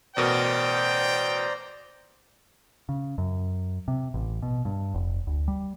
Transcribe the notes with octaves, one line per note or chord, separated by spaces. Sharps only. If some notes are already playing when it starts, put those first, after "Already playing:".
A1 B2 A#4 C5 D5 G5 A#5
C#3
F#2
C3
A1
B2
G2
F1
D2
G3